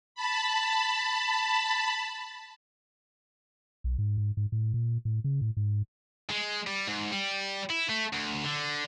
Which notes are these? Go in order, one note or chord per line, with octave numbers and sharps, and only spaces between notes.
A5 B5
B1
G#2
G#2
G#2
A2
A#2
A2
C#3
A2
G#2
G#3
G3
G#2
G3
E4
A3
D2
D3